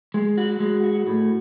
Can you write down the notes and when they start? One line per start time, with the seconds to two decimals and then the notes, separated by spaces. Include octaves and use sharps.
0.14 G#3
0.38 F#4
0.60 G#3
0.84 F#4
1.07 A2